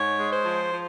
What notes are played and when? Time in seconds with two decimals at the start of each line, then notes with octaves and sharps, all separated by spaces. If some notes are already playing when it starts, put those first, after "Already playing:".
Already playing: G#2 C#5
0.18 G#3
0.31 C5
0.45 F3
0.73 F3